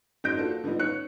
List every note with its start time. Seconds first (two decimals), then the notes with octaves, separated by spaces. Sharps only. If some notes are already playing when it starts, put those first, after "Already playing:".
0.24 F#1 F#2 D#4 G6 A#6 D7
0.37 A#3 D4 F4 F#4 A4
0.64 D3 F3 G3 B3 D#4
0.79 D#3 C#5 F#6 C#7